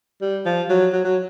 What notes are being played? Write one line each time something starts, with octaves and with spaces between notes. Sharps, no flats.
G3
F3
F#3
F#3
F#3